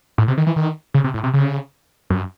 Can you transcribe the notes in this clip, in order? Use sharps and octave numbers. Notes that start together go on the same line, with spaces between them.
A2
C3
D#3
E3
D#3
C#3
C3
A2
C3
C#3
F#2